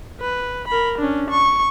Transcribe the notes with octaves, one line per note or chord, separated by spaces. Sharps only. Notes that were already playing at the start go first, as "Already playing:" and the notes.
B4
A#4 B5
C#4 D4
C#6